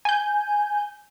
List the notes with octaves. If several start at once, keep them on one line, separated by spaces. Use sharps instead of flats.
G#5 G6